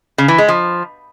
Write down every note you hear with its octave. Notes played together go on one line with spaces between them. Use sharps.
C#3
E3
G#3
F3